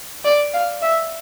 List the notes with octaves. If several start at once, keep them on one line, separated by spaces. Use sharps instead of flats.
D5
F5
E5